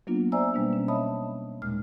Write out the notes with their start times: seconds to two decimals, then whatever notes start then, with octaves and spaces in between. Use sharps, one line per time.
0.07 F#3 A#3 B3 D4 F4
0.32 C5 D5 E5 G#5 A#5 E6
0.54 B2 G3 A#3 D4
0.73 C#4
0.88 C#5 D#5 E5 A5 B5 D#6
1.62 D#2 A#2 G#3 F6